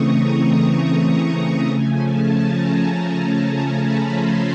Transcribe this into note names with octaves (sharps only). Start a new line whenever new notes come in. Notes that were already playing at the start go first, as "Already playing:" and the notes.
Already playing: C#3 E3 A3 C4 A#5 C#6 D#6
A#5
C#3 F3 A3 C#4 G#5
A5
A#5
A5
A#5
B5
C6